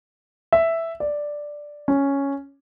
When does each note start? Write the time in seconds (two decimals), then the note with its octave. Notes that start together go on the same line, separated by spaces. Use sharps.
0.53 E5
1.00 D5
1.88 C#4